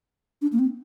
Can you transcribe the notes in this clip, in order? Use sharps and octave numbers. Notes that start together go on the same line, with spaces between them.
D4
A#3
C4